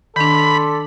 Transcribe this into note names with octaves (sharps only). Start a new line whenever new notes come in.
D#3 D4 A4 D5 B5 C6